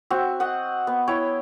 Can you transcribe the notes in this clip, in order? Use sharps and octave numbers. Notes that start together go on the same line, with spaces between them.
C4 F#4 E5
D#5 F#5
B3
E4 C#5 G5